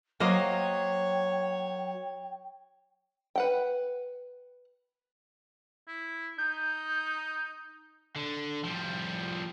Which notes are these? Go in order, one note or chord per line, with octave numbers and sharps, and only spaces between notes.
F#3 A#3 C5 C#5 D#5 G5
B4 F#5 G5
E4
D#4 G6
D3
F3 G3